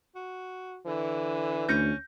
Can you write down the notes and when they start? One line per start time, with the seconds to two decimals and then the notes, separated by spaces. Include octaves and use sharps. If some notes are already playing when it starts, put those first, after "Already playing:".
0.15 F#4
0.87 D3 E3
1.68 D2 C#4 G6 A#6 C#7